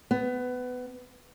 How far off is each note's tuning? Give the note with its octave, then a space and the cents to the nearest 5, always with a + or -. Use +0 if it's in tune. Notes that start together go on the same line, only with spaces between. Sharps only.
B3 +20